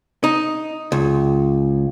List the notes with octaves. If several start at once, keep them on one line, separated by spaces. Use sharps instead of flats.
D#4
C#2